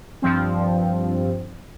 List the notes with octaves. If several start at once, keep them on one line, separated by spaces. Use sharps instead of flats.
G2 F3 C4